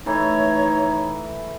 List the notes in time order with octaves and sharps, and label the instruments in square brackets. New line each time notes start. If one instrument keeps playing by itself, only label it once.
[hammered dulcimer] E3 A3 [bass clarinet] D#4 [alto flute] C#5